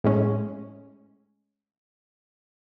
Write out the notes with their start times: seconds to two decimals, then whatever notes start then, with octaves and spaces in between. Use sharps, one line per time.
0.04 A2 G#3 C#4